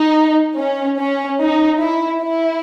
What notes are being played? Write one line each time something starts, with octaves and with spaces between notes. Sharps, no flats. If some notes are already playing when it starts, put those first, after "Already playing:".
Already playing: D#4
C#4
C#4
D#4
E4
E4